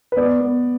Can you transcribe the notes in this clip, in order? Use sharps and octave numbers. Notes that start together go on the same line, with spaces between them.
B4
B3 D5
B3